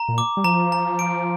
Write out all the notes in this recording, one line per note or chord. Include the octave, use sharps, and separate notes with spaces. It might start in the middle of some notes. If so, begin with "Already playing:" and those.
Already playing: A#5
A#2
D6
G3
F3 A#5
A#5
D7